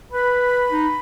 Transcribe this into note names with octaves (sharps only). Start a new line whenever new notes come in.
B4 B5
D#4